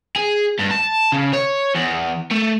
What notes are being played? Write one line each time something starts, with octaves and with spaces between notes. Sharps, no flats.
G#4
G2
A5
C#3
C#5
E2
A3